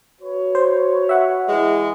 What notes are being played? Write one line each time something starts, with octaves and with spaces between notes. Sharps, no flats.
F#4 B4 C#5
C5
E5 F#5
E3 G#3